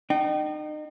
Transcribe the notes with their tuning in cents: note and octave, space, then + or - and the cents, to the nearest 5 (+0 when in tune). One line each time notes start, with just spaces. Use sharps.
D#4 -35 G5 -30